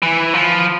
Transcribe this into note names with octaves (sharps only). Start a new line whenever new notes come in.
E3
F3